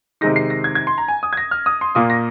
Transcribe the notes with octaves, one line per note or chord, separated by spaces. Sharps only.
C3 D#3 G#3 D#4 A#6
C7
A#6
G#6
G#6
C6
A#5
G#5
D#6
G#6
A#6
F6
D#6
C6
A#2 A#3 F4 D#6
A#6